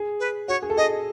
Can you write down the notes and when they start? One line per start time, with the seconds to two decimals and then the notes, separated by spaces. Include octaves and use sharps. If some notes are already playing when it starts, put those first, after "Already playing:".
Already playing: G#4
0.20 B4
0.48 F#4 C#5
0.62 G#4
0.70 A4
0.77 G#4 D#5